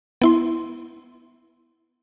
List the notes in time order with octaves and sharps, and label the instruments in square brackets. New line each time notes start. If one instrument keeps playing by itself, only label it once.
[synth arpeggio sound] B3 E4 C6